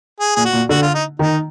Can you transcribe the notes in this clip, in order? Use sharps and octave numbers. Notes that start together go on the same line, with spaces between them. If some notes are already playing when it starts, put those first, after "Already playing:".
G#4
A#2 G#4
F#4
A#2
D3 F#4
F4
D#4
D#3 D#4